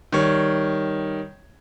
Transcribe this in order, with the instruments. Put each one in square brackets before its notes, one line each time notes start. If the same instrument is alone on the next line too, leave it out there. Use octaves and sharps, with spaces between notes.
[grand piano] D#3 G3 C#5